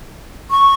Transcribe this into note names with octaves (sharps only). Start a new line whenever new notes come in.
C#6